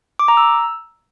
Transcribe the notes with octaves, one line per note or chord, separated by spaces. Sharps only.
D6
A#5
E6